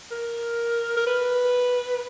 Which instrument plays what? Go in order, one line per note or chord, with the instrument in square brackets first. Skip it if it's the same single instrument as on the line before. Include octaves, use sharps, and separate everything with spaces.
[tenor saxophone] A#4
A#4
B4